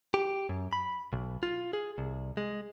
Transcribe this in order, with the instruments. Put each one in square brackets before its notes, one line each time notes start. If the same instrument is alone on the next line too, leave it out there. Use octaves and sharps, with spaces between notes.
[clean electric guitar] G4
F#2
B5
B1
F4
G#4
C2
G#3